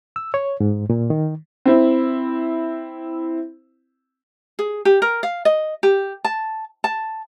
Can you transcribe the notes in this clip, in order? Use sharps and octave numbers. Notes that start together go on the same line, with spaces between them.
E6
C#5
G#2
A#2
D#3
C4 E4
G#4
G4
A#4
F5
D#5
G4
A5
A5